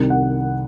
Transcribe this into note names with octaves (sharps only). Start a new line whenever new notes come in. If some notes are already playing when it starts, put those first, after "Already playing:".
Already playing: C2 C3 D#3
F#5